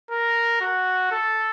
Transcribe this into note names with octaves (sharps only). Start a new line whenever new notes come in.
A#4
F#4
A4